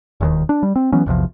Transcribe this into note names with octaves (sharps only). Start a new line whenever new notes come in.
E1 D#2 D#3
D4
G3
C4
E3 F#3 B3 C#4
A#1 E2 C3 F3